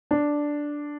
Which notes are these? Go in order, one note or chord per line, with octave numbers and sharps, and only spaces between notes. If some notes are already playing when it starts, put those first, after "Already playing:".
D4